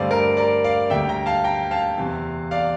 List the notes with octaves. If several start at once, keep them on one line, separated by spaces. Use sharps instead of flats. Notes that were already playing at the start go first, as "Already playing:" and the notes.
Already playing: G2 D3 A3 C4 D5 F5
A#4 D5
A#4 D5
D5 F5
D2 D3 G3 A#3 E5 G5
G5 A#5
F5 A5
G5 A#5
F5 A5
E2 C3 E3
D5 F5